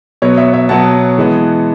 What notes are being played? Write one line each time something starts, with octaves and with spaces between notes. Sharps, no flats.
B2 F#3 B3 C#5
C#5 E5
C#5 E5
B2 F#3 B3 F#5 A5
E3 G#3 B3